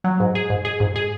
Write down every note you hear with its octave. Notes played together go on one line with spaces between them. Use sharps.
F#3
G#2
G#4
G#2
G#4
G#2
G#4